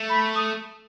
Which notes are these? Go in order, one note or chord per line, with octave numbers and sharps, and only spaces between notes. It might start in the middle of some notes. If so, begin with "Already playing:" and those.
Already playing: A3
B5
D#6